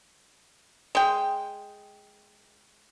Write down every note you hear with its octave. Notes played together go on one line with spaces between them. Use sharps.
G#3 G5